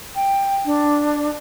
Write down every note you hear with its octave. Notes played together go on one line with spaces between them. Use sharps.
G5
D4